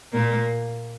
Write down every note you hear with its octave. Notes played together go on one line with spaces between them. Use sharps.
A#2 A#3